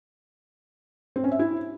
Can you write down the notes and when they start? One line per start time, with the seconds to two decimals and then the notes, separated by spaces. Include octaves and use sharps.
1.16 C4
1.24 C#4
1.32 E5
1.39 E4